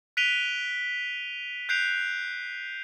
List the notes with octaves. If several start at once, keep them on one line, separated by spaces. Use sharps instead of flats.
F#6 B6 D7 D#7 F7 G7
F#6 G6 C7 D7 F7